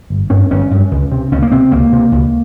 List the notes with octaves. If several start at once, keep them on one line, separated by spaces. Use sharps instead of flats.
G1
G2 C#4
G1 C#4
G2
C#2
C3
C#2 C#4
A#3
C3 C4
C#2 A#3
C3
C#2